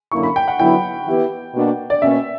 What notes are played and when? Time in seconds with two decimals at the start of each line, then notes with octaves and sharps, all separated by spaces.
0.12 F#2 D3 A#3 C#4 E4 C#6
0.23 B5
0.36 G5
0.48 F#5
0.59 D3 F#3 B3 E4 G5
1.07 E3 B3 E4 G4 B4
1.54 B2 A#3 D4 F#4
1.90 D5
2.01 B2 A#3 C#4 E5